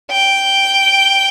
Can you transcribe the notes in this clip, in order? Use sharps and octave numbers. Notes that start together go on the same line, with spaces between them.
G5